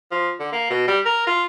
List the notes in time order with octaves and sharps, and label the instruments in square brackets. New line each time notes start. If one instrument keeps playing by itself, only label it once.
[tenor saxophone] F3
D3
A#3
B2
G3
A#4
F4